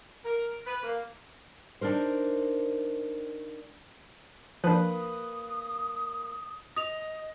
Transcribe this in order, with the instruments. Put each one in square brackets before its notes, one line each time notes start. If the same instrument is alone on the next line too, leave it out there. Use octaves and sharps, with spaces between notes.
[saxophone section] A#4
B4
A#3
[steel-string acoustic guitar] D4 D#4 A#4 C5
[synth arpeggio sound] F3 D4 [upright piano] A#3 B4 F#6 [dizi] D#6
[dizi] D#5 [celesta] D#6 F7